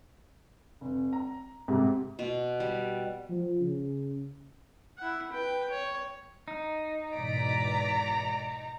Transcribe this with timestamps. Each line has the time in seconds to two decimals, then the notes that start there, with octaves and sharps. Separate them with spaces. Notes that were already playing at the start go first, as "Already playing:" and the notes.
0.81 F1
1.13 A#5
1.68 G#2 C3
2.19 B2
2.60 G3
3.30 F3
3.60 C#3
4.98 E4 F#5
5.32 B4 G5
5.70 C#5
6.48 D#4
7.14 E2 G#2 B2 D5 A#5 B6 D7